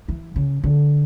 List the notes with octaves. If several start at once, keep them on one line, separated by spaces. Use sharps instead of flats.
E3
C#3
D3